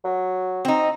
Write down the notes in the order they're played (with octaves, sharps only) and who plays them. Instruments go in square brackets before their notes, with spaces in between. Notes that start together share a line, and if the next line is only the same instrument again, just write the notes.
[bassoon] F#3
[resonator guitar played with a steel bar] C4 D#4